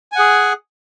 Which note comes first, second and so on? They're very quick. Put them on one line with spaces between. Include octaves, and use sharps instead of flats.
G#5 F#5 G#4